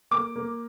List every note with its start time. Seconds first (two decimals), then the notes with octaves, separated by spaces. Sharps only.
0.11 A#3 D6
0.36 A#3